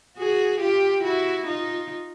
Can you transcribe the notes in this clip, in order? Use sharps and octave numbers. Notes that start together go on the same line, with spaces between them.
F#4 G#4
F4 G4
E4 F#4
D#4 F4